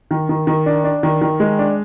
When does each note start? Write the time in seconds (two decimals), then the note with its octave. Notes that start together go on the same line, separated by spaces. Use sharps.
0.11 D#3
0.29 D#3
0.47 D#3
0.66 D4
0.84 D4
1.03 D#3
1.21 D#3
1.40 G#3
1.59 D4